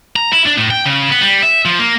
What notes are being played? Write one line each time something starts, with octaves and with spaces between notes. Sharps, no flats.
A#5
E4
D4
A2
G5
C#3
B3
G3
E5
F3
A#3